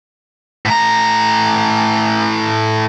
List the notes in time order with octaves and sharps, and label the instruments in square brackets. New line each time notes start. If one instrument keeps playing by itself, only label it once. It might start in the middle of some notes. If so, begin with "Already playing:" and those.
[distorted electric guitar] A2 A#5